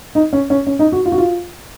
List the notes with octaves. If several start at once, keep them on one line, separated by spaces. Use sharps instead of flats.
D#4
C#4
C#4
C#4
D#4
F#4
F4
F#4
F4